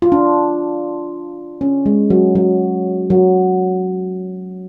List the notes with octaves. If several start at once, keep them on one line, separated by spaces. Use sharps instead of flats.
F4
D4
C#4
G#3
F#3
F#3
F#3